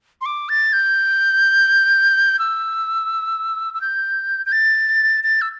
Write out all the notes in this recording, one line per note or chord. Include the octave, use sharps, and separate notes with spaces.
C6
D6
A6
G6
E6
E6
G6
G6
A6
A6
E6